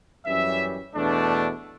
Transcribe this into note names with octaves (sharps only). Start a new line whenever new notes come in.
F#2 E3 G3 C#4 E5
E2 B2 A3 D4